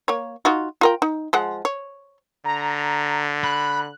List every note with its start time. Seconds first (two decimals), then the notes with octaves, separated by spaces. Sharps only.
0.08 A#3 C#5
0.45 D#4 F4 F#4
0.81 F4 A#4 G5
1.02 D#4
1.33 F3 G#3 F#5
1.65 C#5
2.45 D3 A#5
3.44 B5 F#6